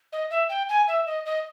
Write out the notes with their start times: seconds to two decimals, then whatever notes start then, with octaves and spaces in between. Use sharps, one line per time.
0.12 D#5
0.30 E5
0.49 G5
0.69 G#5
0.88 E5
1.06 D#5
1.26 D#5